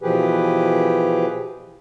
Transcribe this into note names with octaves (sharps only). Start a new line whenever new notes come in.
B2 E3 F3 G4 G#4 B4